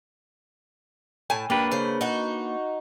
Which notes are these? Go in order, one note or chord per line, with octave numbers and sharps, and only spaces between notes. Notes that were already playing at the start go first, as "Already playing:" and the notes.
A2 G#5 A5
A#3 D4 G4 B4
C#3 C5
D#4 F#4